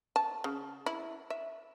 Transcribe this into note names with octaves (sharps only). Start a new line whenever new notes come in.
A5
C#3
E4
E5